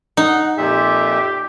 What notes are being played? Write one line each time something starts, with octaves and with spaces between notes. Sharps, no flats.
D#4 F#5
F2 A#2 G4 E5